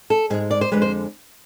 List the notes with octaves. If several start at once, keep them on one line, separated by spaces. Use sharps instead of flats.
A4
G#2 G#3 G#4
D5
C5
F2 D3 F3 G#3 B4
C5